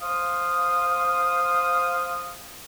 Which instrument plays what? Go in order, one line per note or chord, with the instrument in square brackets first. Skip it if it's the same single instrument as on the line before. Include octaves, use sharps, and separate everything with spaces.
[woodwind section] C5 F5 D#6